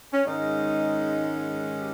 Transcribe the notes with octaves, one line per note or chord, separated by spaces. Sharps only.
C#4
G#2 D#3 G#3 C#4 D#4
G4